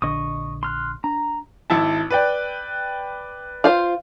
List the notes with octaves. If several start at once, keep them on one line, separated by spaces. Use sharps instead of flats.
A#1 D3 D#5 C#6 D#6
C6 F6 F#6
D4 A#5
G#1 E4 A5
B4 D5 G5
F4 C5 F5